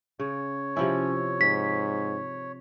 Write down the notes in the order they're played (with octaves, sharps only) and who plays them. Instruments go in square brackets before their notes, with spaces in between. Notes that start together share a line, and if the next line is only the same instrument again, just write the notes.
[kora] C#3 [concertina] C#5
[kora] C3 F3 E4 [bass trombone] C#4
[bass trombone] G#2 [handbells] B6